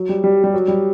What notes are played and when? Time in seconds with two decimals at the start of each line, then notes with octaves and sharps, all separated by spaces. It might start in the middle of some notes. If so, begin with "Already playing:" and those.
Already playing: F#3
0.09 G3
0.24 G3
0.44 G3
0.54 F#3
0.68 G3